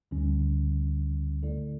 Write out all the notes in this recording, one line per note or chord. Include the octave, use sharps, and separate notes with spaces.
D2 D3 G3 C#4
D3 A3 E4 A4 D5